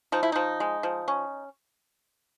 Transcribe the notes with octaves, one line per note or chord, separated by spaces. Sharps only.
F3 D#4
E4
F3 D#4
G#3
F3
C#4